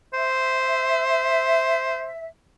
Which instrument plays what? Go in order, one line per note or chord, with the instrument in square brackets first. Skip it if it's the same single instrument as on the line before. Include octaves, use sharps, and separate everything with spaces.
[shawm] C5 [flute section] E5